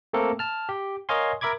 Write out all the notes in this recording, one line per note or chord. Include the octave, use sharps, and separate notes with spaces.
A3 A#3 C4 A4 A#4
A5 F6
G4
A#4 C#5 D#5 F5 G#5 C6
A#4 E5 B5 D6 G#6